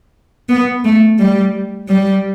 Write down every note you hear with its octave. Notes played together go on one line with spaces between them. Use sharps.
B3
A3
G3
G3